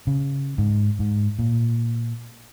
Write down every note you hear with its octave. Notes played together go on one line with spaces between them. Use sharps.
C#3
G#2
G#2
A#2